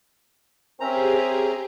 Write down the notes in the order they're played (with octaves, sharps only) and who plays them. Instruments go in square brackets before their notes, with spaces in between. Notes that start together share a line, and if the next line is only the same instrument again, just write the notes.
[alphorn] C4 [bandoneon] C#4 A#5 [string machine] G4 G#4 [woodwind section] A#4 C5 E5